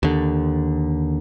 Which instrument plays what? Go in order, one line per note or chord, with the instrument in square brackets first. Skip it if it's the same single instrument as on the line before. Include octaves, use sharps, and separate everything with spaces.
[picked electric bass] D#2 D3